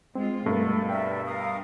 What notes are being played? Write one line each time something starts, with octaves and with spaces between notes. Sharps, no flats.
G#3 C4 F4
G2 B2 A3 A4 A#4
A#4 D5 E5 G5
A#4 F5 D#6